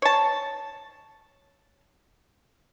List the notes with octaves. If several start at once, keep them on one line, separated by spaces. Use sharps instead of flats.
C#5 A5